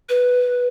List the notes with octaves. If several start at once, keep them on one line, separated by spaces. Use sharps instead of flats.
B4